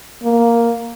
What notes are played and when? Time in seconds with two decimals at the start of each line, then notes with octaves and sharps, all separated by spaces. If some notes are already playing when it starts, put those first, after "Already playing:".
0.24 A#3